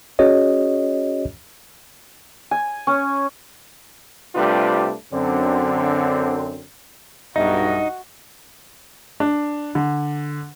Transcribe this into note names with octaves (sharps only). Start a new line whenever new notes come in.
C#4 F#4 G#4 C#5 D#5
G#5
C#4
C3 G3 A3 D4 F4 B4
F#2 D3 C4
B1 G2 D#4 F#4 D#5 E5
D4
D3